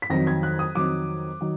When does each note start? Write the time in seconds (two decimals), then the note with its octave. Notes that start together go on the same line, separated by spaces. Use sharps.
0.02 B6
0.10 F2 D#3 F#3 A#6
0.27 G#6
0.43 F#6
0.59 D#6
0.75 F2 D#3 F#3 D6
1.41 D#3 F#3